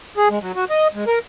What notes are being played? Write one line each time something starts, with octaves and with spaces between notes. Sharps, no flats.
G#4
G#3
F#3
F#4
D#5
G#3
A#4